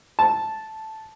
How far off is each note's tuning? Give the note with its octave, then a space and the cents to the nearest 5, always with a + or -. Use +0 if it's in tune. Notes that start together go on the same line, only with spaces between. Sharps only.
A5 -5